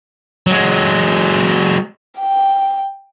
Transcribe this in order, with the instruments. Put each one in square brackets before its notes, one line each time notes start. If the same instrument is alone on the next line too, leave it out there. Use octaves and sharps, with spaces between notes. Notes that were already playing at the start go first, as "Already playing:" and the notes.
[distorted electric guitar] F#3 G#3
[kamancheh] G5